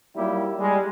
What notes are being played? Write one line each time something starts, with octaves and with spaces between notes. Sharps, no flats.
F#3 G3 A#3 D#4 E4 G4
G3 G#3